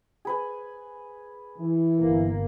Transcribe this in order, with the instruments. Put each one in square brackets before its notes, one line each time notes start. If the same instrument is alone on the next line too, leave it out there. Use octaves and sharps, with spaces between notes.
[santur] G#4 B4 G#5
[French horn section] E3
[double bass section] G1 A#3